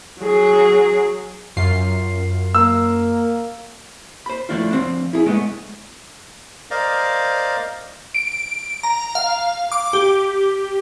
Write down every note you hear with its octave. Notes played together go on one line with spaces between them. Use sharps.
F#3 G#4
F#2 F4 C7
A#3 E6
C5 B5
F3 G#3 A3 D4 E4 F4
F3 C4 D4
E4 G#4
G#3 A3 B3 D4
A#4 C5 D5 D#5 F5
D7
A#5
F5
D6
G4